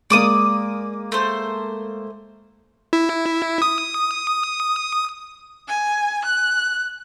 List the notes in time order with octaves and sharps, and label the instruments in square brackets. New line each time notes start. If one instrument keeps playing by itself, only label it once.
[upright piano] G#3 A#3 [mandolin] D5 D6 D#6
[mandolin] A3 C5
[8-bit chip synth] E4
D#6
[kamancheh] G#5
F#6